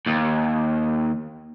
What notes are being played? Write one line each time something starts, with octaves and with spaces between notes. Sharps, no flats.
D#2